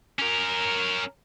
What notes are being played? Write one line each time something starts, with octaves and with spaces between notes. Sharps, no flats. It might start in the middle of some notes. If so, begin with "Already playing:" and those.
C#4 A#4